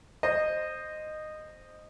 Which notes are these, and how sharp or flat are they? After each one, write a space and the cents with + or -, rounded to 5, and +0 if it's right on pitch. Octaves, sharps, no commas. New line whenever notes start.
C5 +0 D#5 -15